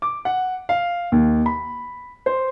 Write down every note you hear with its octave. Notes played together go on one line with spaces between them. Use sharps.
D6
F#5
F5
D#2
B5
C5